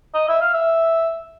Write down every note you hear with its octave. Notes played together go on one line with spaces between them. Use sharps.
D#5
E5
F5
E5